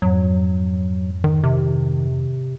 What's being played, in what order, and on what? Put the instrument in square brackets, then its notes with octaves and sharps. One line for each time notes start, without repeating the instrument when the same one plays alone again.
[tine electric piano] F2 G#2 [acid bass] F#3
[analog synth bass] D#3
[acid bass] C3